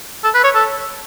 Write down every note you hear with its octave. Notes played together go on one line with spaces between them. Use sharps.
A4
B4
C#5
A4